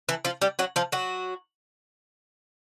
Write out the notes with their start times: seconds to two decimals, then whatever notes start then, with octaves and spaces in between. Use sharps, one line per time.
0.09 E3 E4
0.25 F3 F4
0.42 G3 G4
0.59 F#3 F#4
0.76 F3 F4
0.92 F#3 F#4